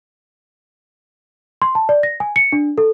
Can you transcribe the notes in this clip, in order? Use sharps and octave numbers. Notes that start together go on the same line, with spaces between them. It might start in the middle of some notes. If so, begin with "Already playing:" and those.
C6
A5
D5
A#6
G#5
C#7
D4
A4